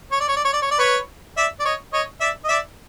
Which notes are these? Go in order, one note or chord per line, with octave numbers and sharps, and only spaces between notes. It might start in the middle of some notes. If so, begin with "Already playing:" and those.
C#5
D5
C#5
D5
C#5
D5
C#5
D5
B4 C#5
D5 E5
D5
C#5 D#5
C#5 D#5
D5 E5
D#5
D5 E5